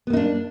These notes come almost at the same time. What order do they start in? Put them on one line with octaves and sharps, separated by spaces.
B3 A#3 D#4 D4